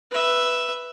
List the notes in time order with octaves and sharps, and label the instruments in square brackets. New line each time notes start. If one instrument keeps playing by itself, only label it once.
[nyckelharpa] B4 E5